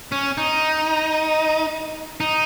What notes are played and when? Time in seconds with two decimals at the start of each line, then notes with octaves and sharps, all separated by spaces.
0.12 C#4
0.38 D#4
2.20 D#4